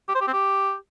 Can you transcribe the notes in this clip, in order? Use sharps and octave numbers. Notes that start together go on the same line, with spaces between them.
G4
C5
G4
C4
G4